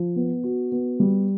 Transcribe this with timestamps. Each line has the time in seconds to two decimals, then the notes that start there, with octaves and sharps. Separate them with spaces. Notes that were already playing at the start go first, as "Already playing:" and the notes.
Already playing: F3
0.16 B3
0.44 F#4
0.72 B3
1.00 G3